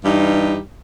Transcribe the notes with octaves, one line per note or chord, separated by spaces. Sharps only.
G2 E3 G3 D#4